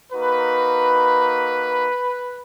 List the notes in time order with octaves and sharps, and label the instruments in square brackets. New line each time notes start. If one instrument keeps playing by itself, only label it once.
[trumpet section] A#3 D#4 F#4 B4